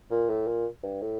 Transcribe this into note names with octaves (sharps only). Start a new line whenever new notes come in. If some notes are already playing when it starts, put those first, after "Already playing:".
A#2
A2
A#2
G2
A2